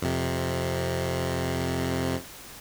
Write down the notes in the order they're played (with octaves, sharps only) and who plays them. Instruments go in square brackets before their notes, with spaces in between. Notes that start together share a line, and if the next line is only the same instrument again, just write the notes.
[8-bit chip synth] F2 C3